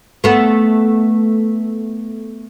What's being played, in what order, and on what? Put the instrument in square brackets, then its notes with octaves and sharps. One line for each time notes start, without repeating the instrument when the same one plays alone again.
[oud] A3 B3